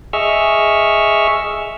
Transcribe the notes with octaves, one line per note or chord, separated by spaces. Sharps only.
G#4 D#5 E5 C#6 E6 F6